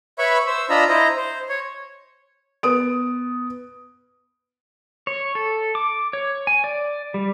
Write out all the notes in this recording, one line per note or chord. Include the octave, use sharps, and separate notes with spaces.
B4 C#5 E5 B5 C#6
C5 E6
D4 F4 D#5 A#5 B5 E6
E4 C5 D#5 A#5
C5
C#5
B3 D#6 D7
C#5
A4
D6
C#5
G#5
D5
G3